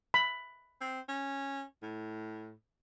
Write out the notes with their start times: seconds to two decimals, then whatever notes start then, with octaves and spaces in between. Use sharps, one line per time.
0.14 B5
0.81 C4
1.08 C#4
1.83 A2